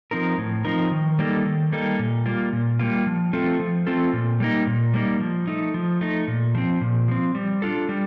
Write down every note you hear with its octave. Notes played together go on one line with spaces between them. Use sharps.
F3 C4 D#4 A#4
A2
F3 C4 D#4 A#4
D#3
G3 A#3 D#4 A4
D#3
G3 A#3 D#4 A4
A#2
G3 A#3 F4
A#2
G3 A#3 F4
F3
A3 C4 F4 A4
F3
A3 C4 F4 A4
A#2
G3 A#3 D#4
A#2
G3 A#3 D#4
F3
A3 D#4
F3
A3 D#4
A#2
F3 C4
A#2
F3 C4
G3
D4 F4 A4
G3